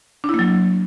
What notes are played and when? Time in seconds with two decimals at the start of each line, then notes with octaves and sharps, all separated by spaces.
0.24 D4
0.29 E4
0.34 A#3
0.39 F#3